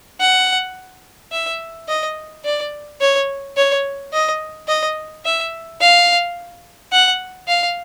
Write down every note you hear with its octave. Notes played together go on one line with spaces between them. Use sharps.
F#5
E5
D#5
D5
C#5
C#5
D#5
D#5
E5
F5
F#5
F5